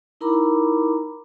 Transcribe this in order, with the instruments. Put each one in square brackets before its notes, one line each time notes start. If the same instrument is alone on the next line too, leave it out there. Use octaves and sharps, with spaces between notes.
[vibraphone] D#4 E4 A#4 A#5 B5 D6